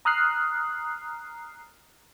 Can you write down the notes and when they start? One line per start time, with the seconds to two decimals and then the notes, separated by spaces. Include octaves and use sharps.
0.05 A#5 D#6 F6 F#6 C7